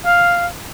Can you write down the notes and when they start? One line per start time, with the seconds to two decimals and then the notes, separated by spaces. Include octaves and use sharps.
0.03 F5